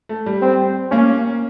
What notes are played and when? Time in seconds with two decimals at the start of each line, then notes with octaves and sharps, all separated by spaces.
0.09 A3
0.26 G3
0.42 C4
0.91 A#3 C#4